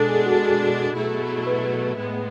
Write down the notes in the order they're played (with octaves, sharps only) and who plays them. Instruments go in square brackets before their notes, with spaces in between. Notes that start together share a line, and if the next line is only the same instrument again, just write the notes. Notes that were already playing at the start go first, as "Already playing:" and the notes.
Already playing: [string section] B2 G#3 D4 [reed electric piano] A4
[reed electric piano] G#4
F#4
G#4
[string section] B2 F#3 A3 E4
[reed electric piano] B4
[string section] A2 G#3 B3